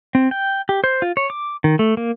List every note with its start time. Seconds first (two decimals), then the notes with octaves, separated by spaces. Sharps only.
0.15 C4
0.31 G5
0.69 G4
0.84 C5
1.02 F4
1.17 C#5
1.30 D6
1.64 D#3
1.79 A3
1.97 A#3